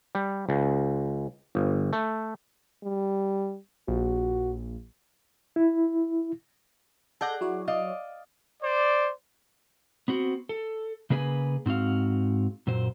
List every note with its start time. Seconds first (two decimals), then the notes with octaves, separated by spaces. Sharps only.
0.15 G3
0.49 C#2
1.55 G1
1.93 A3
2.83 G3
3.88 A#1 F#4
5.56 E4
7.21 G#4 A4 D5 F#5 G6 A#6
7.41 F#3 E4 C#5
7.68 D5 D#5 F5
8.62 C5 D5
10.08 B3 C4 F#4
10.49 A4
11.10 C#3 A#3 G#4 B4 D5 G#5
11.66 G#2 C4 F#4 F5
12.67 F#2 A#2 C5